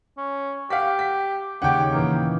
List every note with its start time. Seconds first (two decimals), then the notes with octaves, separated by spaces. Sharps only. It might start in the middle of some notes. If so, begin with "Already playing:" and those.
0.17 C#4
0.70 G4 F5 F#5 B6
0.99 B6
1.62 D#2 C#3 C#4 G4 F#5 G5
1.92 A#2 E3 A#3 D#4